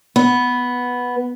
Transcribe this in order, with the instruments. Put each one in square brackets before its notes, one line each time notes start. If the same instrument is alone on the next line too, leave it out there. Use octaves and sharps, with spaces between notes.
[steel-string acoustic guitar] B3